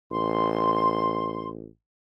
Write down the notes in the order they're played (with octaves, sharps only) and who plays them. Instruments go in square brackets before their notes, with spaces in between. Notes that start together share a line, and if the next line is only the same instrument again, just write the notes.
[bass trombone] A1 [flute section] C6